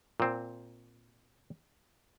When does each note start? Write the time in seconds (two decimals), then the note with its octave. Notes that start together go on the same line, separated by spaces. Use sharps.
0.20 A#2 C4